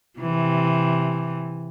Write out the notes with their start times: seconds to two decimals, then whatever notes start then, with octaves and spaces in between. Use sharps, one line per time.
0.20 C3 E3